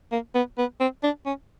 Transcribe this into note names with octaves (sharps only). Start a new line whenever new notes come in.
A#3
B3
B3
C4
D4
C#4